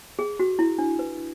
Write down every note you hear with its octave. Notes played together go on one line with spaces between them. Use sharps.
G#4
F#4
E4
D4
B4